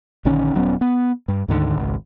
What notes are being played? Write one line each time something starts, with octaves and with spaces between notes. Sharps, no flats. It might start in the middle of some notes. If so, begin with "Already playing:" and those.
A#1 D3 D#3 C#4
D#1 F#3 B3 C#4
B3
G2
D2 G#2 D3 D#3
G#1 C#2